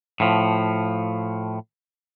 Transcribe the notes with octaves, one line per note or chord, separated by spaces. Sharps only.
A2 F3